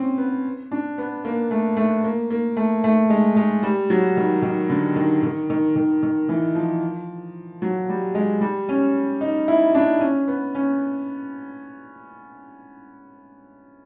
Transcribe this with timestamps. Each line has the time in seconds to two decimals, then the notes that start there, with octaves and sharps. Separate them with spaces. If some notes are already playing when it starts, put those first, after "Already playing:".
Already playing: C4 C#4
0.18 B3
0.71 D4
0.98 B3
1.25 A#3
1.51 A3
1.77 A3
2.04 A#3
2.30 A#3
2.57 A3
2.84 A3
3.10 G#3
3.36 G#3
3.63 G3
3.90 F#3
4.17 D#3
4.42 D#3
4.70 D3
4.96 D#3
5.23 D#3
5.50 D#3
5.76 D#3
6.03 D#3
6.29 E3
6.55 F3
7.62 F#3
7.89 G3
8.15 G#3
8.41 G3
8.69 C#4
9.21 D#4
9.48 E4
9.75 D4
10.00 C#4
10.28 B3
10.55 C#4